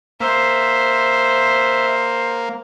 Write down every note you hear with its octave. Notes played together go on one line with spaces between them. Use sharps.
A#3 C5 E5